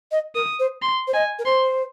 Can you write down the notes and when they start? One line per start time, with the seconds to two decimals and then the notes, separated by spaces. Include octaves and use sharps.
0.12 D#5
0.35 A#4 D#6
0.59 C5
0.82 C6
1.07 C5
1.14 D#5 G#5
1.39 A#4
1.45 C5 C6